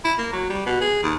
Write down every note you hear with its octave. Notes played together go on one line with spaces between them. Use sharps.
E4
A#3
F#3
G3
B2
G#4
D#2